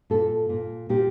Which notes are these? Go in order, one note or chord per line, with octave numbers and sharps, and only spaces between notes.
A#2 A4
A#2
A#2 G4